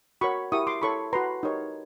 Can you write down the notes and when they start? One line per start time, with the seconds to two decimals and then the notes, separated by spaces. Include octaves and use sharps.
0.21 F#4 A#4 C#5 B5 C#6
0.52 E4 G4 A#4 C#6 D#6
0.67 C6 D6
0.82 E4 A4 C#5 B5 C#6
1.13 F#4 B4 A#5 C6
1.43 D#4 G4 A#4 C#5